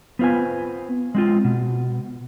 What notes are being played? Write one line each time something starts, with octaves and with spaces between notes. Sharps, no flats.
B3 C4 F4 B4 G#5
G#3 C4 F4
B2